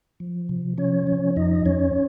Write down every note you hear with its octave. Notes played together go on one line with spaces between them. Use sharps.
F3
C3
F3 C#4 C#5
F3
F2 D#4 D#5
F2 C#4 C#5